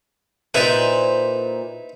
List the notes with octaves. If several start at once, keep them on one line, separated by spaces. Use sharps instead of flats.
A#2 D#4 E4 B4 C5